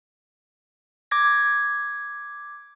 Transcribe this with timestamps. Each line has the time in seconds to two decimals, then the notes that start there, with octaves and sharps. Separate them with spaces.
1.11 D6 G#6 A#6